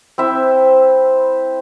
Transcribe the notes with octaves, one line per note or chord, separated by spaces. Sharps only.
C4 E4 E5